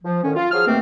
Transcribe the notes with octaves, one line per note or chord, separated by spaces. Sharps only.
F3
A2 D3 D#3 C#4
F4
F3 F#3 G#4 F6
D#2 B2 A3 A#3 C4